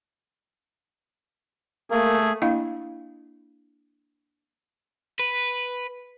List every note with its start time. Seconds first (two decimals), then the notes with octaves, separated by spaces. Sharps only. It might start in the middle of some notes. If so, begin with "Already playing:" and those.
1.91 A3 A#3 G#4
2.42 A#3 D4 E4 D#5 F5
5.19 B4